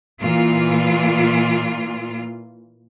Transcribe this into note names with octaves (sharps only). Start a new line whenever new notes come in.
A#2 E3 F4